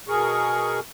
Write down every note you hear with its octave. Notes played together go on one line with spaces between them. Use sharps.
B2 G#4 A#4 C#6